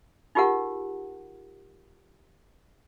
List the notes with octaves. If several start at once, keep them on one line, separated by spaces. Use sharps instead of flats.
D#4 F4 G4 G#4 A#4 F#5